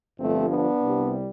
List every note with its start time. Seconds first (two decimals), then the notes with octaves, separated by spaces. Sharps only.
0.19 G1 G2 F3 A3 C4
0.49 B3 D4
0.81 C2 C3 G3